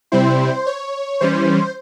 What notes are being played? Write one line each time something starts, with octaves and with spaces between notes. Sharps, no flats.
C3 G3 C4 E4 C5
C#5
E3 G3 C#4 C5